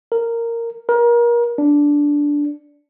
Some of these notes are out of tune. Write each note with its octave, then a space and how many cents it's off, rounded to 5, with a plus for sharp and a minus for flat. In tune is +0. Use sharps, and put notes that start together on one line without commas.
A#4 -10
A#4 +30
D4 -10